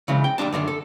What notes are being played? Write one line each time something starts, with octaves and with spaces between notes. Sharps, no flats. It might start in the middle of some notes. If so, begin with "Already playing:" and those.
C#3 E3 F#3 G#3 C#4
G5
D#2 G3 D4 A5
F#2 D3 D#3 D4
A4